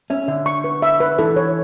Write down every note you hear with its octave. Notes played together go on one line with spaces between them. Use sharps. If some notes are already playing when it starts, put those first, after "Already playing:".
C#4 E5
D3 E5
C#6
B4
E5
B4
E3 A4
C#5